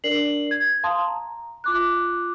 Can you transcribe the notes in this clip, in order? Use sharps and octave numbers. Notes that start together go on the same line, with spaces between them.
D4 A#4 D5 C7 F#7
G#6
F5 A5 C6 D#6
A#5
F4 D6 F#6